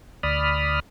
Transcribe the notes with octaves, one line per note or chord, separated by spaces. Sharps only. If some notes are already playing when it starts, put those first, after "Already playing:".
D2 D5 B5 D#6 F6